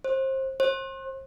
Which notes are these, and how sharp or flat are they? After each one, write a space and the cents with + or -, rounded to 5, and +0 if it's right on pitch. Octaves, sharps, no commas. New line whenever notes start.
C5 +25
C5 +35